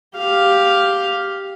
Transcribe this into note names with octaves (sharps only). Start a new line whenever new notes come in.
G4 F5